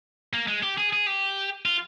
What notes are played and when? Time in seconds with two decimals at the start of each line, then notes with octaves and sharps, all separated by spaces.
0.33 A#3
0.47 G#3
0.63 G4
0.78 G#4
0.93 G#4
1.06 G4
1.66 F4